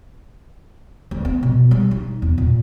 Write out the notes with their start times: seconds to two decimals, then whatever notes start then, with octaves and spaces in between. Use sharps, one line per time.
1.11 D2
1.25 B3
1.43 B2
1.71 G3
1.91 D#4
2.22 E2
2.38 A#2